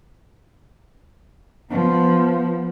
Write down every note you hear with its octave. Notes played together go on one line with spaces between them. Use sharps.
F3 B3